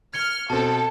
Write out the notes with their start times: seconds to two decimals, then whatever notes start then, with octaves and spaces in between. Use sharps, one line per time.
0.14 F6 G#6 C#7 G7
0.50 B2 C4 A4 A5